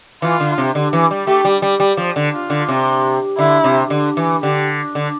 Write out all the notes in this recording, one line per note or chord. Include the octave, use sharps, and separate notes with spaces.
E3 F4
D3
C3
D3
E3
G3
A3 G4
G3
G3
G3
F3
D3
F4
D3
C3
D3 E4
C3
D3
E3
D3 G4
D3